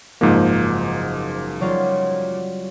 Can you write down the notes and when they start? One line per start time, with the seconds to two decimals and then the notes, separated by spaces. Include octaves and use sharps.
0.21 F#1 G#2 F3 A#3
1.61 F#3 G3 F4